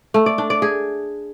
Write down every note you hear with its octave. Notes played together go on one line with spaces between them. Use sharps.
A3
D5
D4
D5
G#4